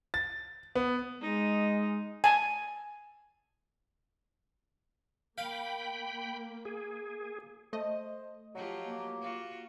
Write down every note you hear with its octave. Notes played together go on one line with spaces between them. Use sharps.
A6
B3
G#3 D#4
G#5 A5
A#3 F5 G5 B5
G#4
A3 C5 D#5
F3 F#3 F4 G4
A#3
F4 F#4